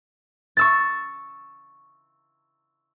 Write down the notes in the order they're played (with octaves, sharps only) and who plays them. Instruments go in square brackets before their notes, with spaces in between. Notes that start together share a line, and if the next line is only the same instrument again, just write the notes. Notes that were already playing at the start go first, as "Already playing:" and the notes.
[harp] C#6 E6 A6